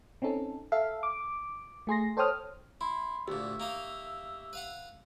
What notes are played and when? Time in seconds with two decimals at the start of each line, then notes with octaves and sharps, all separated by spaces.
0.22 C4 C#4 D#4 A4
0.72 A4 E5 F5
1.03 D6
1.87 A3 G#4 C6 A#6
2.17 A4 C5 C#5 G5 D#6 F6
2.81 E4 B5 C6
3.28 D2 A#2 G4 E5
3.60 A#3 D#4 F5
4.53 B4 F5 F#5